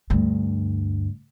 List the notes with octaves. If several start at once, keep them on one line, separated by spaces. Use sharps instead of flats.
D2 G2